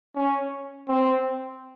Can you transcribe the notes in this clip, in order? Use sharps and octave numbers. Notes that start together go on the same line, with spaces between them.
C#4
C4